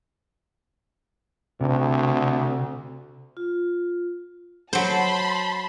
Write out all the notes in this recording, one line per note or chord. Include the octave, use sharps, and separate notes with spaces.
D2 C3
F4
F#3 C5 A5 B5 C6